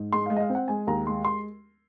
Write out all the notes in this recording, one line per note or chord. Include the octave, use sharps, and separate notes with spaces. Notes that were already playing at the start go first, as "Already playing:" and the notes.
Already playing: G#2
G#3 C6
G#3 F5
D#5
F5
C4
F#5
G#3 G#5
D#2 A#5
G#3 C6
C6